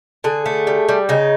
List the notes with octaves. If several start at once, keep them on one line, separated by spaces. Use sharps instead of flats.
D3 G#4
A3
G3
G3
C#3 D#4